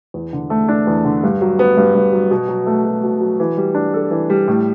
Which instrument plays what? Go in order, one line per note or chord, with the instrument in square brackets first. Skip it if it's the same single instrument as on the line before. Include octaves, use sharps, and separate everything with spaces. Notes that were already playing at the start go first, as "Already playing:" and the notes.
[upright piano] E2
D3
A3
D4
E2
D3
G2
F#3
B3
G2
G2
F#3
B2
F#3
A3
B2
B2
F#3
E3
G3
D4
A4
E3
G3
A2